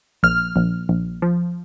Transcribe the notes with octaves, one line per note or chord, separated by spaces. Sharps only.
A#1 F6
A#1
A#1
F3